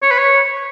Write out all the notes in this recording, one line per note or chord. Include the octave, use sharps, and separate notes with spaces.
C#5
B4
C#5